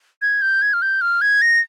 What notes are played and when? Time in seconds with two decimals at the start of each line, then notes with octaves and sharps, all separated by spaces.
0.22 G#6
0.42 G6
0.62 G#6
0.73 F6
0.82 G6
1.01 F6
1.21 G#6
1.42 A#6